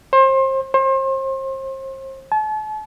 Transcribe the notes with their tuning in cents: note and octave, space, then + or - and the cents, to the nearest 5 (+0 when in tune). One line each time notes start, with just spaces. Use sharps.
C5 +30
C5 +35
A5 -40